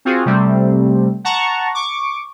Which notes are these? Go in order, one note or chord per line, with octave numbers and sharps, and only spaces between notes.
C4 F4 F#4 G#4
C3 G3 A3 C4
F#5 A5 A#5 C#6
C#6 D6